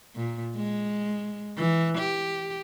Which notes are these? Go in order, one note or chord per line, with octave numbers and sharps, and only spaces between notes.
A#2
G#3
E3
G4